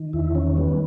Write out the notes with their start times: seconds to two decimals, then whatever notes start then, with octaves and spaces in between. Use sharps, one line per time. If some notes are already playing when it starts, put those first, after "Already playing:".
Already playing: D#3
0.13 E2 E4
0.35 D#3 C#4
0.57 G3 B3